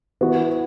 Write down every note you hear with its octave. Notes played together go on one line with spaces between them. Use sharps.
E3 B3 F#4